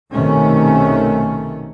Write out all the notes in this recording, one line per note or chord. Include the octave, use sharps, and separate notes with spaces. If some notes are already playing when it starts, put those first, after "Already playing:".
B1 C3 D#3 A3 C#4